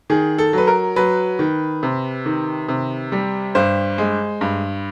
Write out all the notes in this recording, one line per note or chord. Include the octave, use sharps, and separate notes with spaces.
D#3 G#4
A4
F#3 B4
A#4
F#3 B4
D#3
C3
D#3
C3
G3
G2 C5
G#3
G2